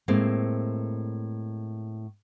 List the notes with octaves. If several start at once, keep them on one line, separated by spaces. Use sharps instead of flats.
A2 G#3 A#3 C4